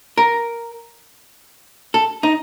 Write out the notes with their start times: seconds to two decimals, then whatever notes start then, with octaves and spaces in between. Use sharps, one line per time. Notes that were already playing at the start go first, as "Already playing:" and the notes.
0.17 A#4
1.94 A4
2.23 D#4